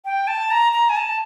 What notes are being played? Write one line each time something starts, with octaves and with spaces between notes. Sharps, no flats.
G5
A5
A#5
A#5
G#5
A5